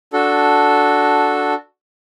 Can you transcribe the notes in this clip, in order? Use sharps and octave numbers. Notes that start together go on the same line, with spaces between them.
D4 F#4 A4